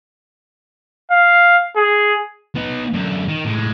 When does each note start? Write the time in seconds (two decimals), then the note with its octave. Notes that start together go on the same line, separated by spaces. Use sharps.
1.11 F5
1.76 G#4
2.56 B3 D#4
2.93 F#2 D3
3.28 D#3
3.45 A2 G#3